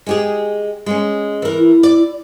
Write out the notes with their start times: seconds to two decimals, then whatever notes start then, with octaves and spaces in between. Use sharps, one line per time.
0.06 G#3 G4 G#4
0.86 G#3 C#4
1.42 E3 A#4
1.58 E4
1.83 D5